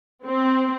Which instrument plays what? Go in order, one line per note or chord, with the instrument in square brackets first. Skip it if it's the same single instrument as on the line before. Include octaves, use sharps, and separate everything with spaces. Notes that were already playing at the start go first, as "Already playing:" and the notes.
[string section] C4